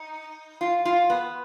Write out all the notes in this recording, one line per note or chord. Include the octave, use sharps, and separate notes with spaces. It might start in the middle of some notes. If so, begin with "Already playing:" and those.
Already playing: D#4
F4
F4
B3